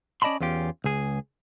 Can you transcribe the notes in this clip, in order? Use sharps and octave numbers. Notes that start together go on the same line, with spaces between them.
C#4 D5 D#5 A5 B5 C6
E2 C#4 F4 G4
C#2 G#4